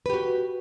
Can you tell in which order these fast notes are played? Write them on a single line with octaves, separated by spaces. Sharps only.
B4 G4 F#4